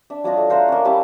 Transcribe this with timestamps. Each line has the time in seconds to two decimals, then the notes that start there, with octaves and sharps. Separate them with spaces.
0.10 D4 E5
0.24 F#3 D4 F4 D#5
0.37 A3
0.50 F4 C5 F#5 A#5
0.68 A#3 C#4
0.85 G3 C#4 E4 A5